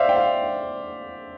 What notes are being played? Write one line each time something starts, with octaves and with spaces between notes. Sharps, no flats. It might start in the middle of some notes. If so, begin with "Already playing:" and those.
Already playing: C5 D5 E5 F5
G5
F5